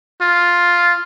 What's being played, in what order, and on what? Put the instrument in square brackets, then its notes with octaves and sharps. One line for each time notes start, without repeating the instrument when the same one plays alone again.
[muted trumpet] F4